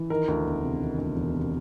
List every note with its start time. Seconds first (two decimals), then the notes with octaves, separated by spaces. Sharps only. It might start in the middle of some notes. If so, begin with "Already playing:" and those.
Already playing: E3
0.10 D#3 A#4
0.28 D2
0.46 E1
0.63 C3
0.81 D#3
0.98 D2
1.16 E1
1.35 C3